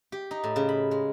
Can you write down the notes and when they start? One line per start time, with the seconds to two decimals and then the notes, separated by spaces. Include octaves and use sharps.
0.12 G4
0.31 D#4
0.44 A2
0.56 C#3
0.69 B5
0.91 G#3